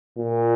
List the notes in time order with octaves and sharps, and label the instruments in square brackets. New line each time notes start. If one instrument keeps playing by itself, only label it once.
[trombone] A#2